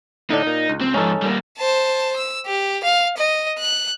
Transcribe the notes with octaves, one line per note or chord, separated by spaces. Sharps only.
A2 D3 D4 D#4
A#2
C#2
C4
G#2 F3 C#4 D#4 A4
G3 A#3
C5 A5
E6
G4
F5
D#5
F#6